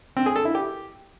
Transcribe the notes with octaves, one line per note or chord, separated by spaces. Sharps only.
C4
G#4
A4
E4
G4